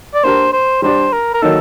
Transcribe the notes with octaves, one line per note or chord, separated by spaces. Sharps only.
D5
A#3 D4 G4 A#4 C5
C5
G3 D4 G4 C5 D5
A#4
A#4
D#3 F#3 A#3 D#4 A4